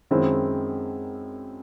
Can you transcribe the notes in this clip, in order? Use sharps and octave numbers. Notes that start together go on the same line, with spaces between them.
F#2 D#3 G#3 C4 E4